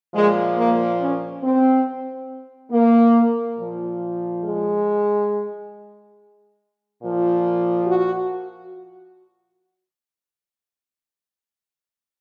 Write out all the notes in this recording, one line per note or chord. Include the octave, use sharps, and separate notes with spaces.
A#2 F3 G#3
A#3
C#4
C4
A#3
A#2 F3
G#3
A#2 F3
F#4